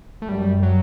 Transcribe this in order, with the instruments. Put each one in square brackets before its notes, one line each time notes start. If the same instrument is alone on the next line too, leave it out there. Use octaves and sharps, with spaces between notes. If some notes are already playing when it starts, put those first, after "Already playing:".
[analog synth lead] A3
[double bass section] F#2 [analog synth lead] G3
[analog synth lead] F#3